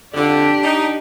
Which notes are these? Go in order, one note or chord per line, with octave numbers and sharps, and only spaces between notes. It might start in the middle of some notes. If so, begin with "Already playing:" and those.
F2 D3 D4 G4
D#4